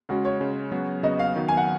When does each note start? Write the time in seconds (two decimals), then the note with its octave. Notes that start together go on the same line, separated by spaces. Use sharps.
0.09 C#3 G#3 C#4 F#4
0.25 C#5
0.40 C#3 G#3 C#4
0.72 C#3 F#3 B3 F#4
1.03 C#3 F#3 B3 F#4 D#5
1.19 F5
1.35 D#3 F#3 B3
1.48 G#5
1.57 F#5